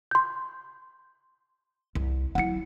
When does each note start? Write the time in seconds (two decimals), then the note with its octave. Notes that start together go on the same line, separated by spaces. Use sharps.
0.11 C6 G6
1.95 C2
2.35 F#3 E4 F#5 C#7